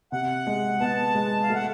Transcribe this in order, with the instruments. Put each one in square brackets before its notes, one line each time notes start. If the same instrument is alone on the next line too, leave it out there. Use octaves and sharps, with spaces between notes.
[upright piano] C3 [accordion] F#5
[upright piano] G#3
[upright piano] B3 [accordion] A5
[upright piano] G#3
[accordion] F5
[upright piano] A3
[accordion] F#5